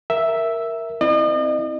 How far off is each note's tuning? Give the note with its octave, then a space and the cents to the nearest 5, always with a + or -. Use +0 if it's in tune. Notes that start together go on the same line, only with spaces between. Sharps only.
A#4 +0 E5 +0
C4 +0 E4 -15 D#5 -40